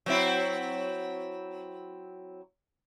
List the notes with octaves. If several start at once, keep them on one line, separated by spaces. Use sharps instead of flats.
F#3 C4 E4